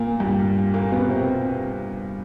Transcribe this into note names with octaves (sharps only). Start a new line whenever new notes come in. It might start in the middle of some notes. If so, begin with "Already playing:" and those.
Already playing: A#2 A#3
G2 G3
A#2 A#3
B2 B3
C3 C4